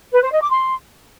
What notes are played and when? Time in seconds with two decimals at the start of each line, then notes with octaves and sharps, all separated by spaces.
0.14 B4
0.23 C5
0.32 D#5
0.41 D6
0.51 C6